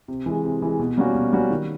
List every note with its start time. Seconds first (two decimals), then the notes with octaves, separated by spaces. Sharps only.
0.08 C3
0.26 E3 G#3
0.44 C3
0.62 E3 G#3
0.80 B2
0.98 G3 A#3 C#4 F#4
1.15 B2
1.33 G3 A#3 C#4 F#4
1.51 D#3